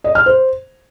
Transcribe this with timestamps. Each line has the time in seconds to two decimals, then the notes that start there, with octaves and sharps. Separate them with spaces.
0.04 D#5
0.15 F6
0.26 C5